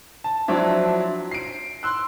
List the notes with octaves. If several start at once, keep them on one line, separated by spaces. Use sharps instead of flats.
A5
F3 F#3 C4 D4 E4
C7 D7
C6 E6 F#6